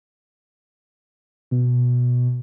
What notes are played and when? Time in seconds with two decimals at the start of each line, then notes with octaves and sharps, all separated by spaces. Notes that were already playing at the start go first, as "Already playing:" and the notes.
1.51 B2